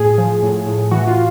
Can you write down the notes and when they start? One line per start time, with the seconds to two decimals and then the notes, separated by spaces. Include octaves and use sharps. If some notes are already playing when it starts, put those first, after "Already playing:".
Already playing: A2 G#4
0.18 F3
0.43 A2
0.67 A2
0.91 E3 F#4
1.07 F4